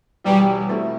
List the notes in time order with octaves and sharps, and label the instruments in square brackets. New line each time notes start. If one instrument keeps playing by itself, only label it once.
[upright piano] E1 E2 B2 [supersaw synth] G3
[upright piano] B2 A3 C4 E4